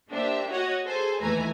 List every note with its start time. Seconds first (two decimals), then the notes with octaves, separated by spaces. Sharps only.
0.10 A#3 D4 G4 C5 E5
0.50 F#4 C#5 D#5 F#5
0.85 G#4 A4 C5 G#5
1.21 D#2 E3 A3 B4 G#5 A#5